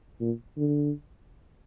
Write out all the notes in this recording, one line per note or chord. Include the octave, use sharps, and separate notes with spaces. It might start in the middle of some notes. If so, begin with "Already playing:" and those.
A#2
D3